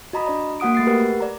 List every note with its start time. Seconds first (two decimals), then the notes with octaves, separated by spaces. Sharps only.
0.13 F#4 D#5 A#5 B5 D#6
0.26 D4 D5 A#5
0.60 A#3 F#4 F#5 D#6 D7
0.75 A3 A6 C7
0.87 G4 A#4 B4 F#5
1.20 D5 A#5